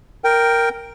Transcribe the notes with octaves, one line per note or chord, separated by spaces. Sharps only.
A#4 G5